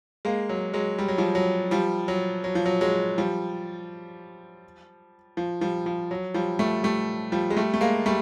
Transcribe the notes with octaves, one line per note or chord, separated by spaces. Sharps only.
G#3 A#3
F#3
F#3 G#3
G3
F#3
F3 G3
F#3
F3 G3
F#3
F#3
F3
F#3
F#3 G#3
F3 G3
F3
F3 G3
F3
F#3
F3 G3
G3 A3
G3 A3
F3 G3
G#3
G3 A3
A3
G#3 A#3
G3 A3